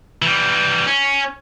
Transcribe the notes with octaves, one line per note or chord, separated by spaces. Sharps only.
E3 G3
C#4